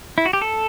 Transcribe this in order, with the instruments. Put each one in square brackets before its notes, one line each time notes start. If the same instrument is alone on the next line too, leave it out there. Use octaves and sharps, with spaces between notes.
[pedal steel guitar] E4
F#4
G4
A4